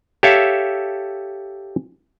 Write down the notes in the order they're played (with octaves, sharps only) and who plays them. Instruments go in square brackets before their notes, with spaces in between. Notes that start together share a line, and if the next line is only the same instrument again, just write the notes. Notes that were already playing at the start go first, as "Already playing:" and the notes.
[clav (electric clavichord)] G4 A4 C#5 E5 F5